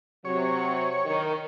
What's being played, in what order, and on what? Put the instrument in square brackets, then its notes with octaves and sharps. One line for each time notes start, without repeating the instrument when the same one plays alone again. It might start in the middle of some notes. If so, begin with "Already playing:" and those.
[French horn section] C3 F#3 [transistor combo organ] C#5
[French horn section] D#3